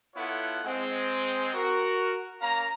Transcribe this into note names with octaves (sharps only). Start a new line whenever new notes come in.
B3 E4 F4 A4 C#5 F#5
G#3 C4
F#4 A#4
A#3 C#4 F5 A#5